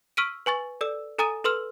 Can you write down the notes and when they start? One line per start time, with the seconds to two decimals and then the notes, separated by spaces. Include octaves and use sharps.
0.17 C#6 E6 F6 B6 D7 D#7
0.46 B4 G#5 C#6 A6
0.81 A4 D5 E6
1.19 A4 G#5 A#5 D#6 A6 D#7
1.44 A4 B4 C6 E6 F6